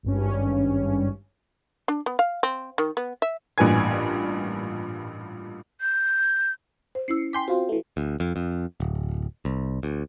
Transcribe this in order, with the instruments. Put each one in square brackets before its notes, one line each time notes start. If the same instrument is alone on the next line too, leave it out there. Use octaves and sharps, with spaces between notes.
[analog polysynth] G#1 G2 C#4
[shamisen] D4
B3
F5
C4
D#3
B3
E5
[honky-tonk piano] A1 G2 A#2 B4 G#5 G#6
[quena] G6
[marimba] C5
[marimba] C#4 E4 E6 [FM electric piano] C7 C#7
[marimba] G5 G#5 D6 [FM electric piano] C6 G6 B6
[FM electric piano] C4 F4 C5 [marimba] F#4 F5
[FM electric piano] E3 A3
[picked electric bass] D2
F2
F2
D1
C2
D2